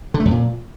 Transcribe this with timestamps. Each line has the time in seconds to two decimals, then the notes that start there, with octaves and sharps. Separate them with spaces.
0.14 D3
0.20 A3
0.25 F2
0.31 A#2